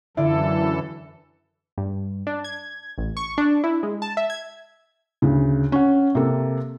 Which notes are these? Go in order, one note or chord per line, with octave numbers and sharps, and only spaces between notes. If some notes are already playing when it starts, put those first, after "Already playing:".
F#2 D3 E3 E4 F4 A4 D5
G2
D4
G#6
A1
C#6
D4
E4
G#3
A5
E5
G#6
D2 C#3
C#4 F#5
C3 A#3 A4